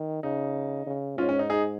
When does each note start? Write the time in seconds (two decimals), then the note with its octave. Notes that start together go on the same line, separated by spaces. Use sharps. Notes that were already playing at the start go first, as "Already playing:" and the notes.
Already playing: D#3
0.23 C#3 D#4
0.87 C#3
1.18 G#2 C#4 F4
1.29 C#4
1.39 D#4
1.50 D#4 G#4